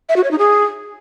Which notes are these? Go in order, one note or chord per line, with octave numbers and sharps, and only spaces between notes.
E5
F#4
C#5
D#4
G#4